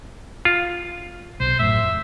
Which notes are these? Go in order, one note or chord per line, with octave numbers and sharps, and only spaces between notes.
F4
B1 C5
A1 F#2 A2 E5
F1